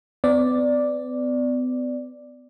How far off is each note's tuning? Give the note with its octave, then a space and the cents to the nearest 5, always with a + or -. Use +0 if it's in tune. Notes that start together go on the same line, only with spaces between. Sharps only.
B3 +40 D5 +0